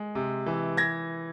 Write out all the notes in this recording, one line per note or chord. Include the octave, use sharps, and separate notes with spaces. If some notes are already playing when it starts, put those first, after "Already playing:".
Already playing: G#3
C3
E3
G#6 A#6